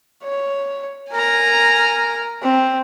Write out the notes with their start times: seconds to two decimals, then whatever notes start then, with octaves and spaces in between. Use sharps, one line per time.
0.23 C#5
1.13 A#4 G#5 A#5
2.43 C4